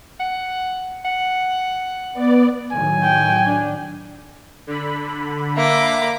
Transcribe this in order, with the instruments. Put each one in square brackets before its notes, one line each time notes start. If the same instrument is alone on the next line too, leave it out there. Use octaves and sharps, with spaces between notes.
[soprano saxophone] F#5
F#5
[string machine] B3 D5
[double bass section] A2 D#3 F#3 [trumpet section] G#5
[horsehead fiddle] G5
D4
[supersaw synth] D3 B5
[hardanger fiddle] A#3 D6 [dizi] E5